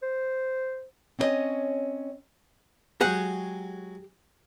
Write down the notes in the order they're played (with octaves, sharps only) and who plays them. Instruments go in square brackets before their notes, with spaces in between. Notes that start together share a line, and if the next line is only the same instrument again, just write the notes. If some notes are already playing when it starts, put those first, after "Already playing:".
[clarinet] C5
[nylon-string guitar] C4 C#4 E4 C#5 D#5
[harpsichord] F#3 G#3 [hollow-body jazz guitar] G4 G#4 F#5